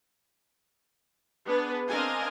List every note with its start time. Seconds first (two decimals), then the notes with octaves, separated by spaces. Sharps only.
1.46 B3 D4 G#4 B4
1.88 C4 D4 A#4 D#5 F5 G#5